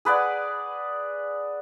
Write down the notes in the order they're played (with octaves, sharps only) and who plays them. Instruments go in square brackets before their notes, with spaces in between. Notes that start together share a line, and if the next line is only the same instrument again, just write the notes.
[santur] G#4 B4 D5 F#5